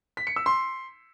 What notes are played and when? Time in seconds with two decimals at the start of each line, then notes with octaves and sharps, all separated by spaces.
0.17 B6
0.27 C#7
0.36 E6
0.46 C6